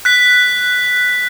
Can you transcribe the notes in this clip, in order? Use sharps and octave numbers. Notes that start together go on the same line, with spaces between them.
F#6 B6